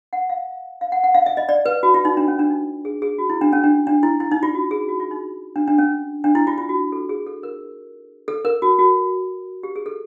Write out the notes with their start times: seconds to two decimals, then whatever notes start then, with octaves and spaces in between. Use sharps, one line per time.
0.13 F#5
0.30 F5
0.81 F5
0.92 F#5
1.04 F#5
1.15 F5
1.26 E5
1.37 D#5
1.49 D5
1.66 B4
1.83 F#4
1.94 F4
2.05 D#4
2.17 D4
2.28 C#4
2.39 D4
2.50 D#4
2.85 G#4
3.02 G#4
3.18 F#4
3.30 E4
3.41 D4
3.53 C#4
3.64 D4
3.87 D4
4.03 E4
4.20 E4
4.31 D#4
4.43 F4
4.55 F#4
4.71 G#4
4.89 F#4
5.00 F4
5.11 D#4
5.56 D4
5.68 D4
5.78 C#4
6.24 D4
6.35 E4
6.47 F4
6.58 F4
6.69 F#4
6.92 A4
7.09 G#4
7.27 A4
7.43 A#4
8.28 A4
8.45 A#4
8.62 F#4
8.79 F#4
9.63 G4
9.76 G#4
9.86 A4